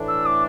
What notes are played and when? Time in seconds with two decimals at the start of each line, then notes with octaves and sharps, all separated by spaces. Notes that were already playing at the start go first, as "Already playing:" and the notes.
Already playing: A2 E3 A3 D4
0.08 E6
0.26 D6